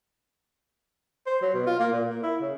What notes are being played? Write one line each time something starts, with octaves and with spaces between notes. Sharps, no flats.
C5
F#3
B2
F4
A#3
A#2
A#3
E4
C#3